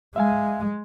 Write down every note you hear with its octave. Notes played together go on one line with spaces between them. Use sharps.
G#3 E5 F5 G#5